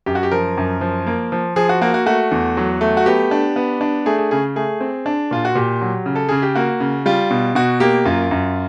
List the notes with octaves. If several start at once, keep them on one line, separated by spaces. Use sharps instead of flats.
F#2 G4
F#4
G4
F3 A#4
F#2
F3
A#3
F3
F3 G#4
F#4
A#3 F#4
F#4
A3 F#4
E2
F#3
A3
F#4
B3 G4
D4
B3
D4
A3 G#4
G#4
C#3 G#4
A3 G#4
C4
D4
A#2 F4
F#4
A#2 G4
F#3
C#3
A4
C#3 G#4
G4
A#3 F#4
C#3
G3 F4
B2
B2 F#4
A#3 G4
F#2 F4
F#2